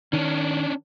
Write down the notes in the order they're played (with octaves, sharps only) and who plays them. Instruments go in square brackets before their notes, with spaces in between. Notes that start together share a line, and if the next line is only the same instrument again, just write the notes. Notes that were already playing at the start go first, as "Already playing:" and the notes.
[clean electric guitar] D#3 [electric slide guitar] C#4 D4